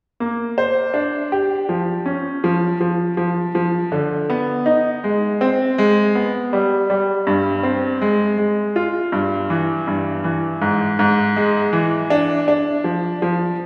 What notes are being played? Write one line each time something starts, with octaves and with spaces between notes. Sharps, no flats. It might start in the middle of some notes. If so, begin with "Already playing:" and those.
A#3
C5
D4
G4
F3
C#4
F3
F3
F3
F3
D3
B3
D#4
G#3
C4
G#3
B3
G3
G3
G2
C4
G#3
G#3
F4
G2
E3
G2
E3
G#2
G#2
G#3
E3
D4
D4
F3
F3